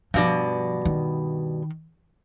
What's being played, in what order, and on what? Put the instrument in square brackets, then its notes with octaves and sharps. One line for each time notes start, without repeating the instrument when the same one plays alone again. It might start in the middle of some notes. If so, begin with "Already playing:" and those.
[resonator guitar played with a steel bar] G2 B2 D5 [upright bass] F3
[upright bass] D#3